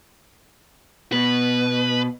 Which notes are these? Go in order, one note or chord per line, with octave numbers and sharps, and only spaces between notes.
B2 B4